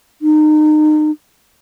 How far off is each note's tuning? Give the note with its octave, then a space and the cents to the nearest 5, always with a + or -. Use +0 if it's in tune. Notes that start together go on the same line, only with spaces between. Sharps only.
D#4 -30